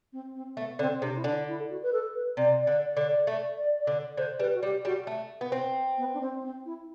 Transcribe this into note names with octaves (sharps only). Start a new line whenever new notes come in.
C4
C4
A3 B3
D3 C4
C3 D4
E4
D3 D4
E4
F#4
B4
A4
B4
C3 D5
D5
D3
D5
D3
D5
A3
D5
D5
D5
D3
D3 C5
G3 B4
F#4
G3 G4
G3 F#4
A3
B3
C4
B3
D4
C4
D4
C4
E4